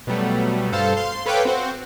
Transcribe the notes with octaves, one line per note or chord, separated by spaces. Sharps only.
B2 F#3 G3 A3
G2 A4 C5 F5 A5
F5 C6
C6
A4 B4 C#5 F5 G5 D6
C4 F#4 C5